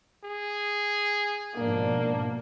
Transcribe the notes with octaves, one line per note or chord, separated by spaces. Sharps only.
G#4
G#2 B2 F3 A#3 D4